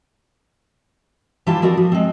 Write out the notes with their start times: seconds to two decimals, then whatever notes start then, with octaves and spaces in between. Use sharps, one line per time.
1.47 E3 G3 E4 F4 G4 A5
1.62 F3 C4 F#4 A#4 D5
1.77 F3
1.92 G#3 C4